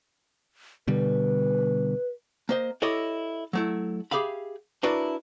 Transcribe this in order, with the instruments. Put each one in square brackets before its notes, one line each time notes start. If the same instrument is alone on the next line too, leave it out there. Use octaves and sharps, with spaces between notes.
[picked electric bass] B2 D3 G3 [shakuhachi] B4
[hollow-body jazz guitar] A#3 C5 D#5
E4 G4 A4 C#5 D#5
F#3 A3 E4
G4 G#4 E5 F5 B5
D4 E4 F#4 A#4 B4 D5